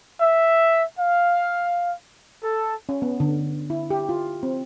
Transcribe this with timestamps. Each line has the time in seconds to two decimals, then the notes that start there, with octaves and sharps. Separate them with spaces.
0.21 E5
0.99 F5
2.42 A4
2.89 C#4
3.02 B3
3.20 D3
3.70 E4
3.90 G4
4.09 F4
4.43 C4